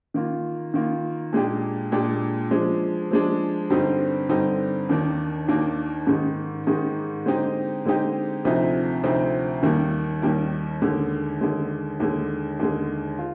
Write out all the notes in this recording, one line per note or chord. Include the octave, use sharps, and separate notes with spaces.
D#3 A#3 F4
D#3 A#3 F4
A#2 G#3 D4 G4
A#2 G#3 D4 G4
F3 G#3 D4
F3 G#3 D4
G2 D3 G3 C4 D#4
G2 D3 G3 C4 D#4
D#2 D#3 A#3 D4
D#2 D#3 A#3 D4
G#2 D#3 G#3
G#2 D#3 G#3
D3 G#3 C4 D#4 G4
D3 G#3 C4 D#4 G4
D2 C3 F3 C4 D#4
D2 C3 F3 C4 D#4
D#2 D#3 G3 A#3
D#2 D#3 G3 A#3
D#2 D3 G#3
D#2 D3 G#3
D#2 D3 G#3
D#2 D3 G#3
F4